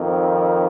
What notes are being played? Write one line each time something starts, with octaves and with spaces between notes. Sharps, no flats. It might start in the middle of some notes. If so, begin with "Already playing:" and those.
Already playing: F2 D#3